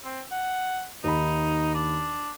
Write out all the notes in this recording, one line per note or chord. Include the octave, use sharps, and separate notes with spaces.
C4
F#5
D#2 D#4 B5
D4